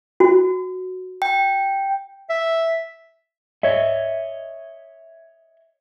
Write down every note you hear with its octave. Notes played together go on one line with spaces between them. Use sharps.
F#4
G5
E5
C#5 D#5 E5